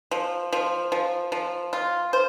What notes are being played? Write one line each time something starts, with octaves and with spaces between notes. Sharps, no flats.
F3
F3
F3
F3
F4
C5